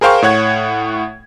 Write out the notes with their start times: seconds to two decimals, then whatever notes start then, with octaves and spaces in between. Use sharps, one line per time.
0.01 G#4 A#4 C5 F5 G5 C#6
0.22 A2 C#5 F#5 G#6